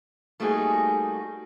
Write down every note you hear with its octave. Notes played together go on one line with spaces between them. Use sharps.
G3 A3 A#3 D#4 F#4 G#4